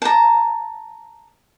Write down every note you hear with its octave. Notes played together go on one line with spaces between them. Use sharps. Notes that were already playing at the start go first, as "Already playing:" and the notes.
A5 A#5